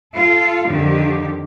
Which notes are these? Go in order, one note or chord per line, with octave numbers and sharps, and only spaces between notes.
F4 A4
F2 D3 D#3 G4